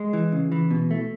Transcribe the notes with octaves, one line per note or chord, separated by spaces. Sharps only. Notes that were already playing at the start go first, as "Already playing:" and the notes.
Already playing: G#3
E3
C#3
E3
B2
A3